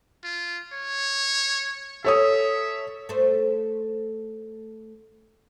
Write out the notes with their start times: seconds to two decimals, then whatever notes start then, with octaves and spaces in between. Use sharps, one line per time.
0.24 F4
0.73 C#5
2.04 A4 C#5 E5 D#6
3.09 A3 C5